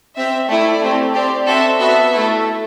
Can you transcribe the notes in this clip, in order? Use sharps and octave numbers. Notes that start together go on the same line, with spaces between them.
C4 G4 E5
A3 E4 A4 D5
A3 C4 G4
C4 G4 D5
C4 F#4 A4 E5
B3 F#4 A4 E5
A3 E4 A4